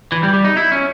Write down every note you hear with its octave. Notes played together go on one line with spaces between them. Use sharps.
E3
G3
G3
D#4
E4
C#4